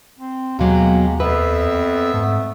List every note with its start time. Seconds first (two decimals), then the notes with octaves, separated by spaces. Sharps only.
0.19 C4
0.59 D#2 B2 F#3 G#3 A#3 G4
1.20 F2 B3 C4 B4 E5 E6
2.14 G#2 A3